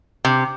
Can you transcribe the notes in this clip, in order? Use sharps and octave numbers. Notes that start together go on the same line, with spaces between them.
C3